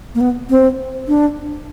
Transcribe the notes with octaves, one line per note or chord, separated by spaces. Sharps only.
A#3
B3
C4
D4